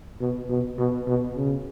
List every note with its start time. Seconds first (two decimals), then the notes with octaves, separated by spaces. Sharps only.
0.21 B2
0.50 B2
0.78 B2
1.07 B2
1.36 C#3